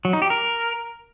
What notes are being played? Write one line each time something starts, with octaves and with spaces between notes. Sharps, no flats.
F#3
D#4
G4
A#4